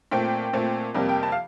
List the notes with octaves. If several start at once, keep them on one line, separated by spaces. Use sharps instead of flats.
A#2 A3 C4 G5
A#2 A3 C4
F2 C3 G3 A#3
G5
A5
F5